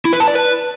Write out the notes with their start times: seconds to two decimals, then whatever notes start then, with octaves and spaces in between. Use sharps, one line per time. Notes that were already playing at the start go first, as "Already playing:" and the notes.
0.05 E4
0.13 B4
0.20 A5
0.28 D5
0.35 B4